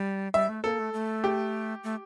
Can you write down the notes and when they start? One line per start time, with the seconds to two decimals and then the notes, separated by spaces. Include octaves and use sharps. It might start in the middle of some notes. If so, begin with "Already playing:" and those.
Already playing: G3
0.34 G3 E5
0.49 A3
0.64 A#3 A4
0.79 A3
0.93 A3
1.24 G4
1.84 A3